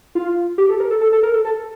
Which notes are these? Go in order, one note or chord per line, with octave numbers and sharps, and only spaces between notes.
F4
G4
A4
A#4
A4
A4
A4
A#4
A4
A4